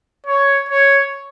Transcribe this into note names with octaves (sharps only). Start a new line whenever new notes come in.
C#5
C#5